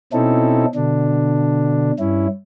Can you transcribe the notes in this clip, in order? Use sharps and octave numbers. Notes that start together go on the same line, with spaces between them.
B2 C4 C#4 D#4 E4 A4
B2 D3 D4
G2 C#4 E4